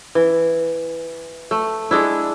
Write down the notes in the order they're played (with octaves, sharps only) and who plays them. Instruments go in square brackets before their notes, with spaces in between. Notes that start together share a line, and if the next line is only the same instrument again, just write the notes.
[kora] E3
A3
G#3 D4 E4